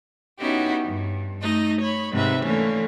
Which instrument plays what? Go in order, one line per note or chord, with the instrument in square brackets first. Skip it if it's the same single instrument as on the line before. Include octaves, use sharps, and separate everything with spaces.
[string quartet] B3 C#4 D#4 E4 F#4 G4
G2
A3 D#4 D#5
C#5 B5
G#2 C3 B4 E5
D3 E3 A3 A#3 C#4